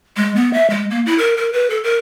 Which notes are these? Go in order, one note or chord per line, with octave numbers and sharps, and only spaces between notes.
G#3
B3
E5
G#3
A#3
E4
A#4
A#4
B4
A4
A#4